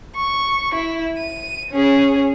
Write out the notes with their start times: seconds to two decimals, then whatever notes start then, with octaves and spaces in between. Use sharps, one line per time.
0.16 C#6
0.74 E4
1.18 D#7
1.71 C#4 G#4